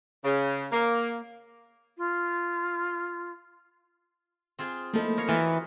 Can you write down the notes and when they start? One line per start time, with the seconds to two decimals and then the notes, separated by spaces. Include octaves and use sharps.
0.25 C#3
0.72 A#3
1.97 F4
4.59 C4 F4 G#4
4.94 F3 A3 A#3 D#4 E4 A4
5.17 A#4 C#5 F5
5.29 E3 F4 F#4